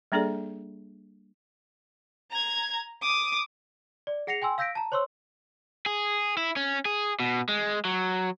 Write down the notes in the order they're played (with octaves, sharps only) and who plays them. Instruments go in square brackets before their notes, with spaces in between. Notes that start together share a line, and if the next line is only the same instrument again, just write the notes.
[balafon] G3 A#3 D4 G#4 A4 D5
[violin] A#5 G#6
D6 D#6
[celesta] D5
G#4 F#5 A#6 C7 C#7 F7
G5 G#5 C6 E6
F5 E6 G6 A#6 B6 D7
A5 A#5
C5 C#5 C6 C#6 E6
[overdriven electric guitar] G#4
E4
C#4
G#4
B2
G#3
F#3